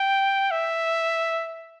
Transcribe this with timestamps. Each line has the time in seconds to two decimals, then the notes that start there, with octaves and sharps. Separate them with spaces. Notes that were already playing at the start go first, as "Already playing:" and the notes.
Already playing: G5
0.51 E5